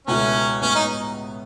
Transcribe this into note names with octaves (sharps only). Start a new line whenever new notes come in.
C#2 B2 A3 C#4 E4
A2 G#3 B3 C#4
D#4